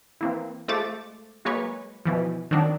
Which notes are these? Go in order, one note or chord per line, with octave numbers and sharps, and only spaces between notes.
E3 A#3 C4
G#3 A3 F4 C5 D6 A6
F#3 G#3 A#3 B4 C#5
B2 E3 F3
D#3 F#3 C4 D4 D#4